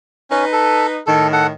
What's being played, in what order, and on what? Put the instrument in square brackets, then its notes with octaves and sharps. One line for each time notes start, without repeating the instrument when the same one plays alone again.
[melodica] C#4 [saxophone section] D#4 B4
[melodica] A4
[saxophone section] A2 D#3 [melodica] A4
[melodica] A4 F#5